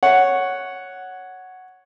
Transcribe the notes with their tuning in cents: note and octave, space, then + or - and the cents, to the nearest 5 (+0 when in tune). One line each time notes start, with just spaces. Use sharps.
C#5 +0 F#5 +0